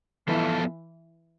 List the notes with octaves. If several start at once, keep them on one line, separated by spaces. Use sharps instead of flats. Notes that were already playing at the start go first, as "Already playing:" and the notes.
E3 F3 B3 F4 A4